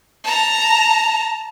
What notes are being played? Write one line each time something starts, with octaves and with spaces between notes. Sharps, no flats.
A5 A#5